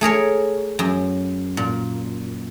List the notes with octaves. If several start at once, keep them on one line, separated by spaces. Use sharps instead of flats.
A3 G#4 A#4 C#5
F#2
A#2